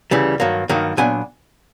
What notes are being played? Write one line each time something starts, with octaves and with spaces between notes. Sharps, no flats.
D2 C#3 E3 G3
G2 D#3 F#3 A#3
G2 D#3 F#3 A#3
A#2 F#3 B3 D4 G#5